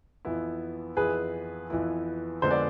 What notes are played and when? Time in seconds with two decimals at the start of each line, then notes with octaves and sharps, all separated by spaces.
0.25 F2 E3 B3 E4
0.97 F2 E3 B3 E4 G#4 B4
1.70 F2 E3 B3 E4
2.42 F2 D3 G#3 B3 C5
2.51 D5